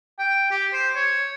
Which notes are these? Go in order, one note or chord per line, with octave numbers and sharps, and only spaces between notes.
G5
G4
C5
C#5